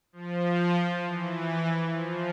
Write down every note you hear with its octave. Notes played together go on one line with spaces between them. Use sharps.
F3
E3
F3